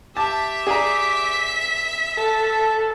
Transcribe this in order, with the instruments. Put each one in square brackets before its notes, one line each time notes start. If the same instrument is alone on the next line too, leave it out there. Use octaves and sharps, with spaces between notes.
[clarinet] G4 [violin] E5 B6 [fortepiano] A5
[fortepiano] G#4 D5 A#5
[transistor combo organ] A4 [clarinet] A5